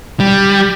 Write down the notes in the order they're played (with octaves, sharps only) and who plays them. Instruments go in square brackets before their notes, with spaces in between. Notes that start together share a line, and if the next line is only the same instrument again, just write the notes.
[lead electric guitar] G3